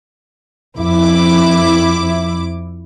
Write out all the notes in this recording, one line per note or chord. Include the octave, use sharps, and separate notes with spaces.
F2 E4 D6